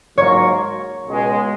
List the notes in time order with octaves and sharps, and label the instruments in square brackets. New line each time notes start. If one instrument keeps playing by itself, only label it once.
[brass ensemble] G#2 F#3 A#3 F4 A#4 [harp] C#5
[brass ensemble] C#2 B2 G#3